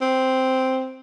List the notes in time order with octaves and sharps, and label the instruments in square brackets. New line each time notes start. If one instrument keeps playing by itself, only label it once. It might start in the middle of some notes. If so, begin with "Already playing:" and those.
[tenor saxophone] C4